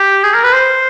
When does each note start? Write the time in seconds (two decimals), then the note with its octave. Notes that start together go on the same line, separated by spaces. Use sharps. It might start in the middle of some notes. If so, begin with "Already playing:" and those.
Already playing: G4
0.24 G#4
0.34 A#4
0.44 B4
0.54 C5